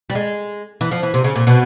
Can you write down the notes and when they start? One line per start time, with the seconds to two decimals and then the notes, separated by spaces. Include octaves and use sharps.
0.10 G3
0.15 G#3
0.81 E3
0.91 F3
1.03 E3
1.14 C3
1.24 C#3
1.36 A#2
1.47 B2